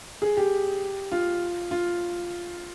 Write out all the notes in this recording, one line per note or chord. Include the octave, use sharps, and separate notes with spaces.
G#4
G4
F4
F4